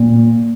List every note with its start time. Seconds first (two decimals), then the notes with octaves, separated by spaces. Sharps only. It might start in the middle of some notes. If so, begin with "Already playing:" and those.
Already playing: A#2